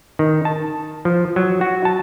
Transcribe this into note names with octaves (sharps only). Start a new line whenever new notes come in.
D#3
A5
F3
F#3
F#4
A5